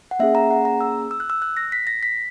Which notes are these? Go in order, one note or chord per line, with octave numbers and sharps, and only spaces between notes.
F#5
A#3 C#4 G#4 E5
A#5
F#5
A#5
E6
E6
F#6
E6
F#6
A#6
B6
A#6
B6